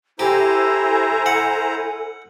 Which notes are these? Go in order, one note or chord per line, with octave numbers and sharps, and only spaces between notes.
E4 G4 A4 C5 G#5 A#5
F#5